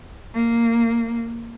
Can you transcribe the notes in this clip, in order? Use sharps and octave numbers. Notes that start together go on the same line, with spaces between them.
A#3